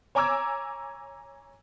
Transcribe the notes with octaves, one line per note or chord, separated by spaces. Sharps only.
C#5 G#5 A#5 D6 E6 G#6